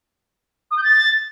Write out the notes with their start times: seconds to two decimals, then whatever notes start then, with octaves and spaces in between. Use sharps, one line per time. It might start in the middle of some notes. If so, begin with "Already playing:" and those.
0.71 D#6
0.77 G6
0.83 A6